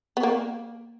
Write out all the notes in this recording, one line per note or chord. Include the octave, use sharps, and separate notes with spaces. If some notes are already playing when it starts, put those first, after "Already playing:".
B3
A#3